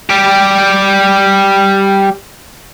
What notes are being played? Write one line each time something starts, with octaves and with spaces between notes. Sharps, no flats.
G3 G4